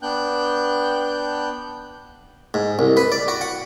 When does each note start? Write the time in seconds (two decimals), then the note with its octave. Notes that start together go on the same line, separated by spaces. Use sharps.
0.02 B3 D4 G5 F#6 G6
2.54 G#2
2.79 C2
2.97 B4
3.12 D5
3.28 F#4
3.41 F#5